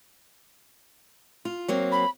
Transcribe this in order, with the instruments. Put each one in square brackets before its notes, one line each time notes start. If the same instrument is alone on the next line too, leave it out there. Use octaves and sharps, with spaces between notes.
[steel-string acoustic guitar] F4
F#3 A#3 C4
[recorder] B5